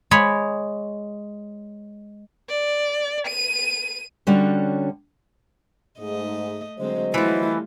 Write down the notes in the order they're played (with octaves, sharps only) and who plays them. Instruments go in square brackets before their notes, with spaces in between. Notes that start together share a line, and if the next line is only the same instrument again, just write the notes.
[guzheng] G#3 C#5 B5
[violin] D5
D#7
[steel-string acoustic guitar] D3 G3 C#4 F#4 C#5
[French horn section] G#2 [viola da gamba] A3 D#5
[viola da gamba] D3 G#3 C4 [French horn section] F#3 C5 D#5
[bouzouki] E3 F3 [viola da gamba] G3 A3 F4 [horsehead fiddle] E4